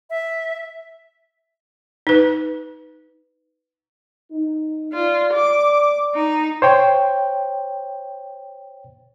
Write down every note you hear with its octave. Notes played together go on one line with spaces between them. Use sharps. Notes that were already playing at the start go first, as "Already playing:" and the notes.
E5
D#4 B4
D#4
F4 D5
D6
D#4
C5 C#5 G5